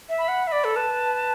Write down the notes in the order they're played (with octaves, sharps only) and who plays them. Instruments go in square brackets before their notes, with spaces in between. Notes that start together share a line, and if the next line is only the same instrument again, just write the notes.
[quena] E5
[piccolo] B5
[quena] F#5
[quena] E5 [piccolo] B5
[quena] D5
A4
[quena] B4 [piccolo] A5